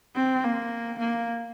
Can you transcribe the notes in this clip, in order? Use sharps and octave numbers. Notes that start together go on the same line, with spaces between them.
C4
A#3
A#3